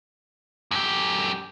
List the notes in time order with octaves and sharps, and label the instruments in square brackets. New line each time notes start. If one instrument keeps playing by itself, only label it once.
[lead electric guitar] F#2 G4